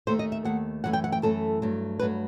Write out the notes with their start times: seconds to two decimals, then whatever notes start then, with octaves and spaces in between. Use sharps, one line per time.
0.07 D#2 D#3 A3 C5
0.19 D#5
0.32 E5
0.44 D#2 D#3 A3 F#5
0.84 F#2 E3 A3 F#5
0.93 G5
1.04 F#5
1.12 G5
1.22 F#2 E3 A3 A4
1.62 G2 F#3 A3
2.00 G2 F#3 A3 B4